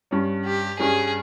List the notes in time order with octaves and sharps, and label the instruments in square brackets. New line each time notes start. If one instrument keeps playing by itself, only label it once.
[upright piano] G2 G3 C#4
[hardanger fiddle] G4
[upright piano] G2 G3 C#4 [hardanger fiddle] G#4